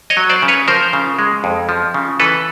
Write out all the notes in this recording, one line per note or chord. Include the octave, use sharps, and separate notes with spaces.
C#5 D#5
F#3
C5 D5
C#3
B4 C#5
F3 A#4 C5
C#3
G#3
F2
F3
C#3
E3 A4 B4